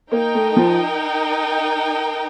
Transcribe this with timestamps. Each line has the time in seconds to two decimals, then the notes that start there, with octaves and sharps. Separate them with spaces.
0.12 A#3 D#4 A#4 D#5 G5
0.35 A3
0.56 F3